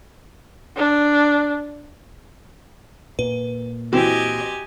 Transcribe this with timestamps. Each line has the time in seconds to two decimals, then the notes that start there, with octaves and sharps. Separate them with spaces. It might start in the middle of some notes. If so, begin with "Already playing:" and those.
0.77 D4
3.19 A#2 B4
3.93 E3 C4 F#4 G4 D#5 G#5